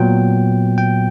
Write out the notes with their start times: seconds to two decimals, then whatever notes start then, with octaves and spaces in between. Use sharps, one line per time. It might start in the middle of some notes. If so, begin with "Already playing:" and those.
Already playing: A#2 F#3 B3 G5
0.78 G5